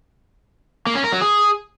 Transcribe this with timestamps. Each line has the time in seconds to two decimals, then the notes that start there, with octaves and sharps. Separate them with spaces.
0.87 A#3
0.95 C#4
1.04 A#4
1.13 F#3
1.21 G#4